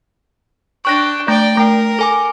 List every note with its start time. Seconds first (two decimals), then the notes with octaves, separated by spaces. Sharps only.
0.85 D4 G5 C#6 F#6 A#6
1.28 A3 D5 G5
1.57 A3 A#4 G5
1.99 A4 G#5 D6